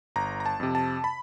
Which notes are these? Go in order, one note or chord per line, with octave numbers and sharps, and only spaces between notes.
G1 A#5
A#5
A5
F2 C3
A5
B5